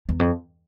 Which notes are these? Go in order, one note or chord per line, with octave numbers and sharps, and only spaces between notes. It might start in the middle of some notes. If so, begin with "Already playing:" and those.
E2
F2